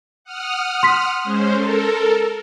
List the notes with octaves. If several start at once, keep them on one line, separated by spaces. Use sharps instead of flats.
F#5 D#6 F6
C6 B6
G#3 C#4 C5
A4 A#4